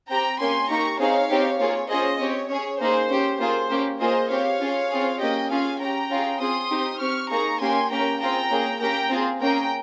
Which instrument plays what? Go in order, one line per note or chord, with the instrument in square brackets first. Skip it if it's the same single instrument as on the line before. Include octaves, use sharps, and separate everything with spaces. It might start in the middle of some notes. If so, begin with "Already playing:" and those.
[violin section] C4 G4 G5 A#5
A#3 C#4 G4 G#5 C6
A#3 D#4 G4 A#5 C#6
C4 D#4 G#4 C#5 F5
C4 D#4 G4
A#3 F4 G#4 C#5
C#4 F4 G#4 C5 D#5
C4 G4 C#5
C#4 G#4 C#5
A#3 D#4 G#4 C5
C#4 G4
A#3 F4 G#4 C5
A#3 C#4 G4
A#3 F4 G#4 C5 D#5
C4 G4 C#5 F5
C#4 F4 G#4
C4 F4 G#4
A#3 C#4 G4 D#5 G5
C#4 F4 G#4 F5 G#5
C#4 G4 G5 A#5
C#4 F4 G#4
C4 F4 G#4 C6 D#6
C4 D#4 G4
C4 G4 C#6 F6
A#3 D#4 G#4 A#5 C#6
A#3 C#4 G4 G#5 C6
A#3 C#4 G4 G5 A#5
C4 F4 G#4 G5 A#5
A#3 C#4 G#4
A#3 C#4 G4 G5 A#5
C4 F4 G#4
A#3 C#4 G#4 G5 A#5